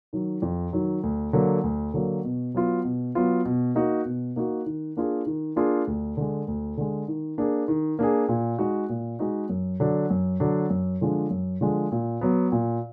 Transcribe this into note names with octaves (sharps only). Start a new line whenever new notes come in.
D#3 F#3
F2
D#3 F#3
D2
D3 F#3 A#3
D2
D3 F#3 A#3
B2
F#3 B3 F4
B2
F#3 B3 F4
B2
A#3 D#4 F#4
B2
A#3 D#4 F#4
D#3
A#3 D4 F4 G#4
D#3
A#3 D4 F4 G#4
D2
D3 G#3
D2
D3 G#3
D#3
A#3 D4 G#4
D#3
A#3 D4 G#4
A#2
G#3 D#4 F#4
A#2
G#3 D#4 F#4
F#2
D3 F#3 D4
F#2
D3 F#3 D4
F#2
D3 F3 G#3 D4
F#2
D3 F3 G#3 D4
A#2
F#3 B3
A#2